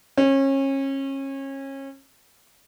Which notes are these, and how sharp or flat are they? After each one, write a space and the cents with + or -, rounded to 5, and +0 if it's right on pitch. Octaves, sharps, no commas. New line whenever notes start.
C#4 -30